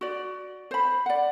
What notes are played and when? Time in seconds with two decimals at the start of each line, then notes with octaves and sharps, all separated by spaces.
0.01 F#4 D5
0.71 C5 B5
1.06 D5 F#5